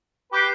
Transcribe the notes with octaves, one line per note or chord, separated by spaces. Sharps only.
G4 B4 D6 G6 C7